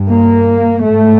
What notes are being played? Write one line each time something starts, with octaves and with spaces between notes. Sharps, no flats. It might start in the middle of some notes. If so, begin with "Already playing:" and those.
Already playing: G2
A#3
G#2 A3